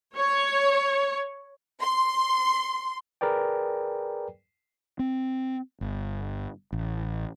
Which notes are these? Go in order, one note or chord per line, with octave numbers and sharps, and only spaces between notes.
C#5
C6
G#4 A#4 B4 D5 G5
C4
G1
A1